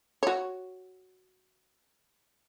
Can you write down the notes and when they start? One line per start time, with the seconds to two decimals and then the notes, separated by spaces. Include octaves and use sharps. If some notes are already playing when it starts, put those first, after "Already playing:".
0.23 F#4 C#5